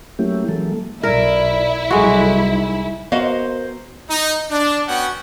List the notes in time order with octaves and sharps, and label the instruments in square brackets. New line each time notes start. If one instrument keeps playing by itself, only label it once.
[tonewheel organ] F#3 A3 A#3 C#4 E4 G4
E3 F#3 G#3 A#3 A4
[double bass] B1 [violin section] E4 [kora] A#4 [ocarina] D5
[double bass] C2 F#3 [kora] G#3 F#4 [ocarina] A4
[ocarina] D#4
[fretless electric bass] B3 [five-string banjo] F#4 D#5 F5 [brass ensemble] A#4 C5
[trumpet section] D#4
D4
B3 C#4 F#4 F#5 G5